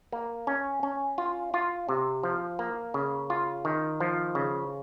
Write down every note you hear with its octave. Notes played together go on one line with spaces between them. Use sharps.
A#3
C#4
C#4
F4
F4
C3
F3
A#3
C#3
F4
D#3
F3
C#3